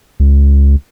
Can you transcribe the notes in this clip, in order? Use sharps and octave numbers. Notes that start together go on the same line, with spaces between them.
C#2